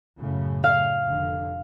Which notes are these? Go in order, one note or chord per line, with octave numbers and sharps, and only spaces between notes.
F#2 A2 C#3
F5
F1 D3